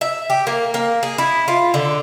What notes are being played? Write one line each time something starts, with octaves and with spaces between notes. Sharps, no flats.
E5
G4
A#3
A#3
G#4
E4
F4
D3